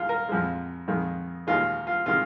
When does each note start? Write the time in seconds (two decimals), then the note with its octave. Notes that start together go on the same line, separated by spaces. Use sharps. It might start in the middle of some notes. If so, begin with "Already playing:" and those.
Already playing: D#2 G#3 F4
0.09 A#4
0.29 F2 F3 G#3
0.88 F2 D#3 G#3
1.47 D#2 D#3 G#3 F4
1.87 F4
2.06 C3 D#3 G#3 F4